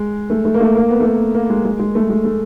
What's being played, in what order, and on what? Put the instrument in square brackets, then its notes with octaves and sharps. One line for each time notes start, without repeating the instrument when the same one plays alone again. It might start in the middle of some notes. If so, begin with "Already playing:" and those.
Already playing: [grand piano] G#3
A3
A3
A#3
A3
A#3
B3
A3
A#3
A#3
G#3
G#3
G#3
A3
G#3
A3